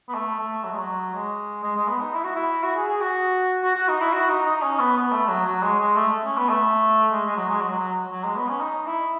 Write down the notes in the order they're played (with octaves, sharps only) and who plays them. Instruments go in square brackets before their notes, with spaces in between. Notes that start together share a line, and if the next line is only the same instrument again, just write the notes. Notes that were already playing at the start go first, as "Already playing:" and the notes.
[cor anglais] B3
A3
A3
F#3
G#3
F#3
G#3
G#3
G#3
B3
D#4
E4
F#4
E4
F#4
G#4
G#4
F#4
F#4
F#4
D#4
E4
F#4
D#4
D#4
C#4
B3
B3
A3
F#3
F#3
G#3
G#3
A3
C#4
B3
A3
G#3
G#3
F#3
G#3
F#3
F#3
F#3
G#3
B3
C#4
D#4
E4